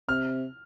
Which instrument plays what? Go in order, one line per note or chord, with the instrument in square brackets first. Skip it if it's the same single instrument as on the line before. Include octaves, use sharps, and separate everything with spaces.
[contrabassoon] C3 [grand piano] F6